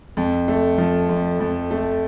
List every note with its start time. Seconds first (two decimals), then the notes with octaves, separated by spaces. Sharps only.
0.17 F2
0.48 A3
0.78 F3
1.09 F2
1.40 F2
1.71 A3